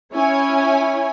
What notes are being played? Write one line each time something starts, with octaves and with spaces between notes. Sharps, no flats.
C#4 E4 C#5 G#5